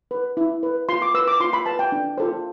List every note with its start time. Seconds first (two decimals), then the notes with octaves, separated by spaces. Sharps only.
0.11 B4
0.37 E4
0.63 B4
0.89 F4 C6
1.02 D6
1.14 B4 E6
1.27 D6
1.40 F4 C6
1.53 B5
1.66 B4 A5
1.79 G5
1.92 D4
2.18 F4 A4 C5